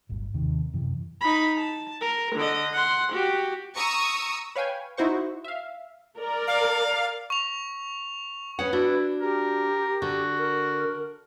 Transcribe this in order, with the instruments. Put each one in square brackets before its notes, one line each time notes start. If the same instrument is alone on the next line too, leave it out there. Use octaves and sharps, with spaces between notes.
[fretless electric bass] D1 G1
D#2 C3 D#3
F#2 C3 E3
[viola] D#4 B5
A5
A#4
D3 D#5
F#5 C6
F#4 G4
[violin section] A#5 C#6 D#6 E6
[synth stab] B4 C#5 F5 G5 G#5
D#4 E4 F#4 C5 C#6
E5 F5
[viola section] A#4 D5
[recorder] F5
[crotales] C#6 F7
[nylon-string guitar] C#4 F#5 [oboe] G#4 [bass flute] B4
[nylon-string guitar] D4 F#4 [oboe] E4
[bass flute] G4 [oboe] A#4
[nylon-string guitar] D3 [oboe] F#4
[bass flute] A#4